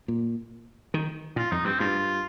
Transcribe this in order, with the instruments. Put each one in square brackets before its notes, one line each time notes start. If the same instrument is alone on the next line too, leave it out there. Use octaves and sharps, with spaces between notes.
[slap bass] A#2
D#3
[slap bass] A#2 [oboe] F4
[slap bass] F2 [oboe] D#4
[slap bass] G2 [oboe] C4
[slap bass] G2 [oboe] F4